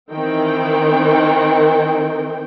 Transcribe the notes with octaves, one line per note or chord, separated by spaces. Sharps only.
D#3 E3 C4 G5